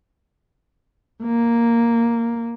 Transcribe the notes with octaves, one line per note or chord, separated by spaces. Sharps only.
A#3